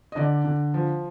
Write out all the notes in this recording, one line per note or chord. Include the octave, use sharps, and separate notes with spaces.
D#5
D3 D5
D3
F3